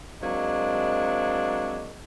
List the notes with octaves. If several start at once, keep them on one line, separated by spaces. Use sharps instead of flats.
F#3 G#3 A#3 C4 D4